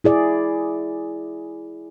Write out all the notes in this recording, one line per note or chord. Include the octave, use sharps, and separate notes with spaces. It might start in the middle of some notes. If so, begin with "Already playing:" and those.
E4 G#4 D5